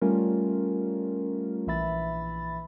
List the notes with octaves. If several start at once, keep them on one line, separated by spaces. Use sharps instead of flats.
G3 A3 C#4 F4 A#4
A#1 E3 E5 B5 A6